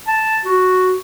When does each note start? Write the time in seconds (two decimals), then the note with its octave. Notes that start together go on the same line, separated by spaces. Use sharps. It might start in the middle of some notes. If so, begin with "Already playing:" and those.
0.07 A5
0.45 F#4